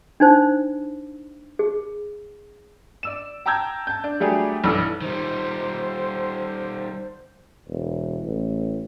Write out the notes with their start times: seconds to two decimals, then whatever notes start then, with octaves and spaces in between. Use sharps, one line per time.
0.20 D4 D#4 C5
1.59 G#4
3.03 D5 E6 E7
3.46 G5 A5 A#5 E6 G6 G#6
3.87 A5 G6
4.04 D4
4.20 F#3 G3 A3 D4 G4 G#4
4.64 B1 G2 E3 A4 D5 E6
5.01 D#3 G3 C5
7.68 E1
8.25 A1